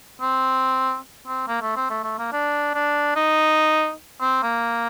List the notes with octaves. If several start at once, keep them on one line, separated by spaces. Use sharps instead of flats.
C4
C4
A#3
A3
C4
A3
A3
A#3
D4
D4
D#4
C4
A#3